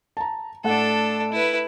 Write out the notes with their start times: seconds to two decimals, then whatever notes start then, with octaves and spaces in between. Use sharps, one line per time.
0.17 A5 A#5
0.64 A2 A3 D4 A4 F#5
1.32 E4 B4